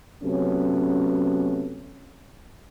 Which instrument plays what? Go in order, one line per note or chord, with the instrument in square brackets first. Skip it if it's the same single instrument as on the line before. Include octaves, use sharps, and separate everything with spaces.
[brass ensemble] C3 F#3 A3 B3 C#4